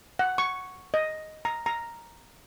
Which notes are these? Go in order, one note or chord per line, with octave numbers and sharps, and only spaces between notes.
F#5
C#6
D#5
A#5
A#5